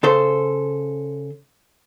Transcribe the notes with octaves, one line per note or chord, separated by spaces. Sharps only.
C#3 A4 C5